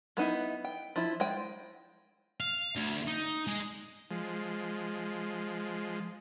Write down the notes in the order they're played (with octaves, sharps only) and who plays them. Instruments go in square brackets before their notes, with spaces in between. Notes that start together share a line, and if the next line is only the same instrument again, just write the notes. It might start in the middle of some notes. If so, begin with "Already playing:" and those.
[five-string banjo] G#3 B3 D#4 E4 E5
G5
F3 E4
G#3 C5 G5
[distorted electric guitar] F5
D2
D#4
G#3
[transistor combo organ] F3 G#3